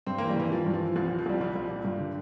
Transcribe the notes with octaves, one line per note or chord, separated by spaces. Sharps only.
G2 C4
E3 A#3
G3
G2 E3
E3 F3
G2
F3
E3
C2 F3
F3
A#2
F3
C2 G3
A#2 G3
C2
A#2
G2
D3